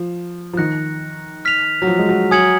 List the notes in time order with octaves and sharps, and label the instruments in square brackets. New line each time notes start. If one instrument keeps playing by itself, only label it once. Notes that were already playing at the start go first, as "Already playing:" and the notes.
Already playing: [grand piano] F3
F3
[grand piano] D#3 [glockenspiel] F#6 A#6 C#7
[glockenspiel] F6 B6 F7
[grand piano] F#3
F3
G#3
F#3
[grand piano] F#3 [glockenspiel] G#5 D#6 G#6 C#7 F#7